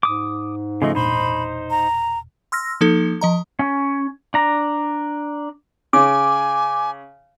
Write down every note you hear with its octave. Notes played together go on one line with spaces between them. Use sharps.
G#2 D6 D#6
C#3 F3 A3 D#5
E1 A#2 D4 D#4 C5 B5
A#5
C6 E6 F6 A#6
F3 A#3 D#4 A4
F3 D#5 A#5
C#4
D4 A#5
C#3 G#5 D6